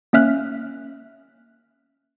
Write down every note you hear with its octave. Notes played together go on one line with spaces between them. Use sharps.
A#3 C#4 E5 F6 F#6